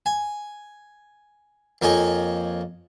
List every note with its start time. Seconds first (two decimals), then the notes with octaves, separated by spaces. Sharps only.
0.06 G#5
1.82 F2 A#3 C#5 D#5 G#5